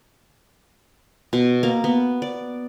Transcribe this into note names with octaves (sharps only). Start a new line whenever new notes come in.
B2
A#3
B3
D5